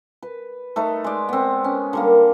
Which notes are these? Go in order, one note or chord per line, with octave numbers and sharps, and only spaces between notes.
B4
A3 D#4 B4
G#3 D5
B3 C4
C#4
D3 G3 A#3